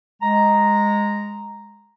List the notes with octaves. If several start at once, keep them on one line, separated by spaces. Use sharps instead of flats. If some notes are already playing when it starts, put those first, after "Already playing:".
G#3 A#5